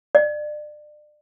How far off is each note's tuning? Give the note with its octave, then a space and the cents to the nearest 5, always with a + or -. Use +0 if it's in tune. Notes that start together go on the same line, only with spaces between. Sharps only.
D5 +30